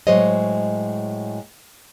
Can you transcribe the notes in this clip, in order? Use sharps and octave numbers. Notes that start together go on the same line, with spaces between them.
A2 F#3 G#3 C5 C#5 D#5